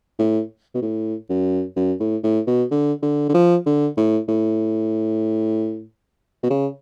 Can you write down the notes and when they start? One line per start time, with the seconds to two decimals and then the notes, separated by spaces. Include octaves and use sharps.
0.19 A2
0.75 B2
0.82 A2
1.29 F#2
1.76 F#2
2.00 A2
2.23 A2
2.47 B2
2.71 D3
3.02 D3
3.29 D3
3.34 F3
3.66 D3
3.97 A2
4.28 A2
6.43 B2
6.50 C#3